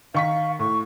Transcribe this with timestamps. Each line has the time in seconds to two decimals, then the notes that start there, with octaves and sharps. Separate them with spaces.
0.14 D#3 F5 C#6 B6
0.59 A2 C#6